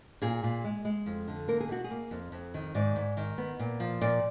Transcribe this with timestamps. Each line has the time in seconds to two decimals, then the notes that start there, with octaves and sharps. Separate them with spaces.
0.22 A#2 G#4
0.44 A#2
0.64 G#3
0.85 G#3
1.06 F2
1.28 D3
1.48 A#3 A#4
1.60 G#4
1.69 B2 F#4
1.84 G#4
1.91 A#3
2.11 F2
2.32 F2
2.54 D#3
2.75 G#2 D5
2.96 G#2
3.17 D#3
3.38 B3
3.59 A#2
3.80 F3
4.01 A#2 D5